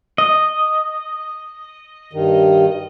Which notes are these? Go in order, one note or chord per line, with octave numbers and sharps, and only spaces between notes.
D#5
G2 D#3